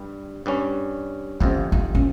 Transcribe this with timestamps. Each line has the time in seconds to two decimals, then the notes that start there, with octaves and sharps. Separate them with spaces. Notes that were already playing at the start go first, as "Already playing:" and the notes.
Already playing: G2 G3
0.46 G2 G3 C#4
1.40 G1 F2 C3 C#4
1.72 D#4
1.95 C#4